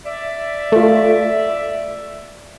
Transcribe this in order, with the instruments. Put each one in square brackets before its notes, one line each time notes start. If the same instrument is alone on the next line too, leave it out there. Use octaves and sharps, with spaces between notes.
[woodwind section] D5 E5
[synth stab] A3 F4